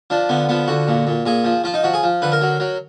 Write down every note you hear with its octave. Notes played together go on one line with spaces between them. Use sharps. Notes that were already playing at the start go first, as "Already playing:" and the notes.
F3 D4
D3 B3
F3 B3
D3 F#4
A#2
A#2
A#2 G#4
F3
F3 F4
D#4
F3 F#4
G#4
F3
D3 B4
A#4
F#3
F#3